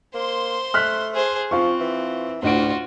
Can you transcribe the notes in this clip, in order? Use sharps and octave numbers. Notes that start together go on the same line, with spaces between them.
A#3 C5 C6
A3 F6 F#6 B6
G#4 C5
F3 C4 F4 F5 C#6
E3
D2 A2 D4 F4 F#4 D7